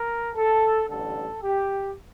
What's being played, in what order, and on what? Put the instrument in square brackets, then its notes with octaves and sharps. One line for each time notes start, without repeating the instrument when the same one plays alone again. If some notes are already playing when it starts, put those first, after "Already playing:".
Already playing: [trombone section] A#4
A4
A1 G2 D3 A4
G4